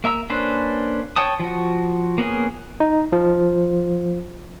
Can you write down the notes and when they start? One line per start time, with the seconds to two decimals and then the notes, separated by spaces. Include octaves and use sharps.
0.04 A#3 E5 A#5 E6
0.30 A#3 C#4 D4 B4 C5
1.16 C#5 G5 A5 D#6
1.40 F3 F#4
2.18 A#3 B3 C#4 G#4
2.80 D#4
3.12 F3